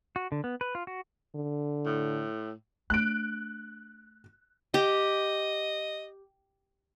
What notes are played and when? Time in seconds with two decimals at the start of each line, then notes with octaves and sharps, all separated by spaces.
0.16 F#4
0.32 D3
0.44 B3
0.61 B4
0.75 F4
0.87 F#4
1.35 D3
1.86 A2
2.90 A3 D4 F#6 D7
4.74 G4 D#5